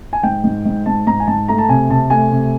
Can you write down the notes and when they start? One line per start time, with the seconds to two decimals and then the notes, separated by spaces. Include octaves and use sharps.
0.13 G#5
0.23 G#2 G5
0.44 G#2
0.65 G#2
0.86 G#2 A5
1.07 G#2 A#5
1.20 G#5
1.27 G#2 A5
1.48 A3 A#5
1.58 A5
1.69 C3 G#5
1.90 C3 A5
2.10 A3 G#5
2.31 C3